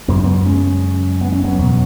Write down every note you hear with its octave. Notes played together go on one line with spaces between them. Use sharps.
F#2 C#3 B3
G#3
F#3 B3
G#3 C#4
B3
C#4
F#3 B3
E2 B2